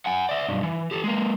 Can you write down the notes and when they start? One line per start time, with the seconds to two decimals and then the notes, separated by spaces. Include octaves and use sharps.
0.06 F#5 G#5
0.29 D5 E5
0.48 B1 G2
0.63 E3
0.91 G4 A4
1.04 G#3 A#3